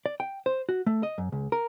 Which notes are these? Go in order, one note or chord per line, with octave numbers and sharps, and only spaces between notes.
D5
G5
C5
F#4
A3
D#5
F#2
C#2
A#4